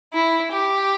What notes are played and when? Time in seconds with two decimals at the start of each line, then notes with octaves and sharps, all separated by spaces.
0.13 E4
0.52 G4